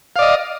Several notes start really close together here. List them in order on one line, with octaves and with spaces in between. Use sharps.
F5 D5 D#5